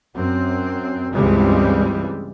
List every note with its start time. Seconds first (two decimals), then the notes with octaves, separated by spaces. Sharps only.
0.14 F#2 C4
1.13 C#2 G2 E3 G3 G#3 C4